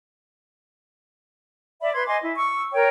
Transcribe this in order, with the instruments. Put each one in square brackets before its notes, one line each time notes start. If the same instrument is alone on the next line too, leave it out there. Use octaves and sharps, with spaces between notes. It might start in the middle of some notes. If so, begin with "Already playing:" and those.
[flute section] D5 E5 B5
B4 C6 G#6
D#5 G#5 C6 D6
E4
C#6 E6
A#4 C#5 G5